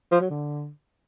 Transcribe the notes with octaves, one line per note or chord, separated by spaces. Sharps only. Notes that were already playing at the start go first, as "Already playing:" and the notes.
F3
F#3
D3